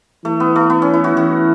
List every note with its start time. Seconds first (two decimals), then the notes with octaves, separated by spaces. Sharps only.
0.25 E3 A3
0.40 B3
0.56 A3
0.70 B3
0.82 C#4
0.94 E4
1.04 F#4
1.16 E3 F#4